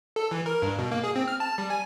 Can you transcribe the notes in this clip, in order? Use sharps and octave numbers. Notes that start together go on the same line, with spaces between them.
A4
E3
A#4
G2
B2
A#3
G#4
C4
F6
A5
G3
G#5